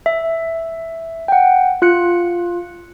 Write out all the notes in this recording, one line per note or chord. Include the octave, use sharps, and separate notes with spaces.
E5
F#5 G5
F4 F#6 C#7